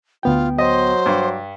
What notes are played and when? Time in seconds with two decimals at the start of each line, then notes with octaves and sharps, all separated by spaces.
0.23 D2 B3 F4 G5
0.58 F#3 C5 D#5
1.06 G2 D6